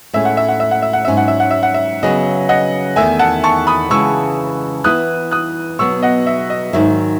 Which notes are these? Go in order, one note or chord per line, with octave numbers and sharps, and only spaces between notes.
A2 G#3 C#4 E5
F#5
E5
F#5
E5
F#5
E5
F#5
G#2 F#3 C#4 E5
F#5
E5
F#5
E5
F#5
E5
C#3 F#3 B3 D#5
D#5 F#5
E2 D#3 A3 E5 G#5
F#5 A5
A5 C#6
B5 D#6
C#3 E3 G#3 C#6 E6
E3 B3 E4 D#6 F#6
D#6 F#6
B2 F#3 B3 C#6 E6
D#5 F#5
E5
D#5
G#2 D#3 F#3 E5